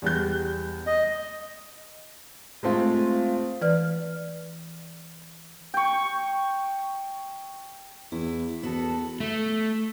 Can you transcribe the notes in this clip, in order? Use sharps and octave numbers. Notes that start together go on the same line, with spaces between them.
E2 G3 G6
D#5
G#3 A3 C4 F4
E3 B4 D5 F6
G5 C#6
E2 E4
E2 B3 F#4 A4
A3